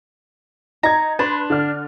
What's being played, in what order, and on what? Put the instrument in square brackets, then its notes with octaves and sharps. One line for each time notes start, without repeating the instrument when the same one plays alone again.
[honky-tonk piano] D#4 G#6 [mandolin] A#5
[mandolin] D4 [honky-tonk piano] B4 C6
[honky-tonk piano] D3 D5 F6